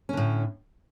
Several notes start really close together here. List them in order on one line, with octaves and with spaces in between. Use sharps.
C#4 D3 A2